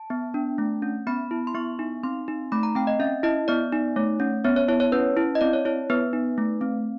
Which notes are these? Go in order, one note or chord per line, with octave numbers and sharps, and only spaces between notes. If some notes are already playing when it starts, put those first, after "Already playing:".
Already playing: A5
B3
D4
A3
C#4
B3 B5
E4
C6
B3 C#6
D#4
C4 C6
D#4
A3 B5
A#5
C4 G5
D#5
C#4 E5
E4 D#5
B3 D5
D#4
A3 C#5
C#4
B3 C#5
C#5
E4 C#5
C#5
C#4 B4
E4
D#5
C4 D5
C#5
E4 C#5
B3 B4
D#4
A3
C4